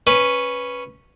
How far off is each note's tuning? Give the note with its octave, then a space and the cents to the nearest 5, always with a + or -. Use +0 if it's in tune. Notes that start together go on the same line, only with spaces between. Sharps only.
C#4 -5 B4 +0